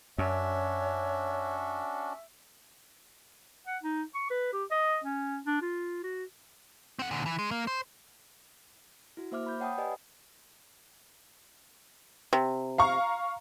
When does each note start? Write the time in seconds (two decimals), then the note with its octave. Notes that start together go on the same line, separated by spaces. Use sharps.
0.18 F#2 C#4 D4 F#4 C#5 E5
3.67 F#5
3.83 D#4
4.14 C#6
4.30 B4
4.53 G4
4.71 D#5
5.04 C#4
5.46 D4
5.62 F4
6.03 F#4
6.99 C4 F#5
7.11 A#2 D3
7.26 E3
7.39 G#3
7.51 A#3
7.67 C5
9.17 E4 F#4
9.32 A#3 C5 E5 D6 F6
9.46 B5 G6
9.60 C#5 F#5 G5 A5 B5 D#6
9.78 G4 B4 D5 D#5 G#5
12.33 C3
12.78 F5 A#5 C#6